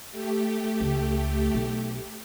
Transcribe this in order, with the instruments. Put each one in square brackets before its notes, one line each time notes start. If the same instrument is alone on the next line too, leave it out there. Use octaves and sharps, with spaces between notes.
[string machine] A3 G4
[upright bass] C#2
B1